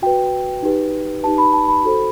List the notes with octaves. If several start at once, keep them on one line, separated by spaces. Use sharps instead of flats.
F#4 B4 G5
D#4 G4 B4
D#4 G4 B4 A5
B5
A5
B5
F#4 A4 C5